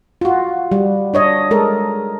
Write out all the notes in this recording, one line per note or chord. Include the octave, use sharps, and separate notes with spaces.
F4 F#4
G3
D4 C#5 D#5
G#3 A4 A#4